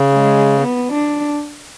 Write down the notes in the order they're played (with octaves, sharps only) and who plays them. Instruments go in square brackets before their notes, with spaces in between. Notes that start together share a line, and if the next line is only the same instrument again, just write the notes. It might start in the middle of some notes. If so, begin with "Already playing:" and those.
Already playing: [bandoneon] C#3
[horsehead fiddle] G#3
B3
D4